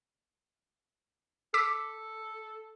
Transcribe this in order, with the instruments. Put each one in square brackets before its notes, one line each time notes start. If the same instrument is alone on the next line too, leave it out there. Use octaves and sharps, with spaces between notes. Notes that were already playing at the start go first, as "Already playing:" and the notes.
[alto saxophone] A4 [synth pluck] D6 E6 B6